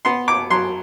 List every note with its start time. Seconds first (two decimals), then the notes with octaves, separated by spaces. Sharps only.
0.05 B3 C6
0.28 D6
0.50 F#3 C6